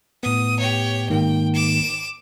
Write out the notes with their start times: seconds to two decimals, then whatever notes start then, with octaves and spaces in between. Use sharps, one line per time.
0.23 A2 B3 D#6
0.60 G4 C#5
1.10 G#2 D#3 A#3 G5
1.54 D6 E7